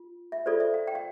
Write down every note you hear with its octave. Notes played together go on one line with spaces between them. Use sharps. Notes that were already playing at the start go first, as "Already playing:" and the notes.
Already playing: F4
E5
F4 A4 C5 D5
E5
F5
G5
F5